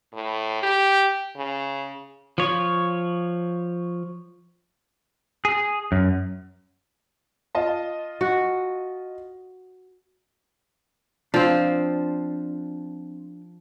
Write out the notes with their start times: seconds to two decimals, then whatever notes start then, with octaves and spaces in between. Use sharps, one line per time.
0.13 A2
0.63 G4
1.36 C#3
2.38 F3 C#5
5.45 G#4
5.92 F#2
7.55 F4 D#5 A5
8.21 F#4
11.34 F3 C4 D4